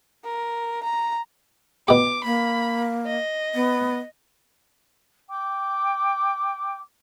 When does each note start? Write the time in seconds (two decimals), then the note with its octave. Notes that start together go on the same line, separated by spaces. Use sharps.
0.24 A#4
0.83 A#5
1.88 B2 G4 D6
2.25 A#3 B5
3.07 D#5
3.54 B3
5.28 G5 D6